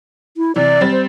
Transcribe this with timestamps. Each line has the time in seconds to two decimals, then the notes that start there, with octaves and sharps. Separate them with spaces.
0.37 E4
0.56 C3 E3 D5
0.81 G3 C4 A6
0.92 C5